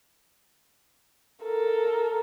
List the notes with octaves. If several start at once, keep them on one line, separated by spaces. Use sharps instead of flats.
A4 A#4